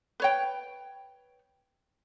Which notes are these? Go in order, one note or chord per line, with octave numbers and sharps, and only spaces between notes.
B4 C#5 G5